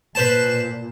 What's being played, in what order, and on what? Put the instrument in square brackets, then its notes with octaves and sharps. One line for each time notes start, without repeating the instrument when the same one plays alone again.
[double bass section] A#2 [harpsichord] B4 C5 A5